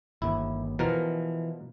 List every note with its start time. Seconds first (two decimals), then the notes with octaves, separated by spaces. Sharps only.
0.22 G1 D#2 E4
0.79 B2 E3 F3 A#4